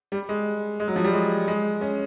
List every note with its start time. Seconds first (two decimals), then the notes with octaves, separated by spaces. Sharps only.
0.12 G3
0.29 G#3
0.80 G#3
0.88 F#3
0.96 F3
1.04 G3
1.13 G#3
1.48 G#3
1.81 C#4